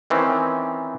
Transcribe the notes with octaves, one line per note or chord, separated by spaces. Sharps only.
D#3 E3 C4 C#4